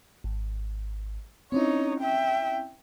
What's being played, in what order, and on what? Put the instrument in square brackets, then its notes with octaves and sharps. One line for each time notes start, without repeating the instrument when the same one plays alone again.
[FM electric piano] G#1
[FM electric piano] C4 C#4 E4 [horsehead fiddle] D#4 C#5
[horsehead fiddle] E5 G5